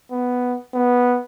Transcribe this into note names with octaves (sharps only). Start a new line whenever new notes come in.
B3
B3